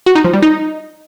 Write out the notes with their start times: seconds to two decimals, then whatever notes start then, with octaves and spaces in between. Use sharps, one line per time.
0.06 F#4
0.15 D#4
0.24 F3
0.33 G3
0.42 D#4